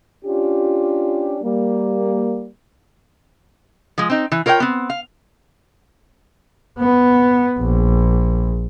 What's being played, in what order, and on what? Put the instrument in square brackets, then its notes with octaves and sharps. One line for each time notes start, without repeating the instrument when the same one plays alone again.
[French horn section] C#4 D4 F4 G4
G3 A#3
[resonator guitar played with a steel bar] F3 G#3
C4 D#4
E3
F4 A#4 C#5 D5 G5
B3 C4
F5
[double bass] B3
A#1